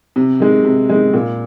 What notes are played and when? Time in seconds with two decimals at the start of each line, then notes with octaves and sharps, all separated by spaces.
0.16 C3
0.40 D#3 G#3
0.65 C3
0.89 D#3 G#3
1.13 A#2